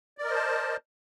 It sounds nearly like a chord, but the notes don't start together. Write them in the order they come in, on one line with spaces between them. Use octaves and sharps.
D5 A#4 D#5 C5 A5